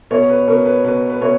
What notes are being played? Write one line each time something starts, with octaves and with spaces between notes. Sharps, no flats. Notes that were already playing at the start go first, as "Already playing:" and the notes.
B2 C#5
B4
B2 A#4
B4
B2 B4
B4
B2 C#5